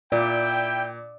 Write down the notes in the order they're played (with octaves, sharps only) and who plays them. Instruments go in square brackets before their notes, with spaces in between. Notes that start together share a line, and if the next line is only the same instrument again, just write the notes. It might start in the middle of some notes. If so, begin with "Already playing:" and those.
[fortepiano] A#2 [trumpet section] E4 G5 [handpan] D5